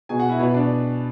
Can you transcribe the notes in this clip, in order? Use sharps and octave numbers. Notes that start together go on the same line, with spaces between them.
B2 G#4 G#5
F#4 F#5
E4 E5
B2 B4
D4 D5